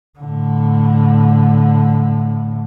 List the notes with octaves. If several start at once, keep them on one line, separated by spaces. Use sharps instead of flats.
A2 D3